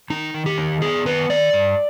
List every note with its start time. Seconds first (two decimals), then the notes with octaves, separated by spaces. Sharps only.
0.10 D#3 D#4
0.34 D#3
0.46 G4
0.58 D#4
0.82 B3 G#4
1.05 D#3 B4
1.30 D#3 D5
1.53 G2